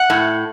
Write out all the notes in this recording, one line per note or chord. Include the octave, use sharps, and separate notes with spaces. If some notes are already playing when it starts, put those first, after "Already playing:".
Already playing: F#5
A2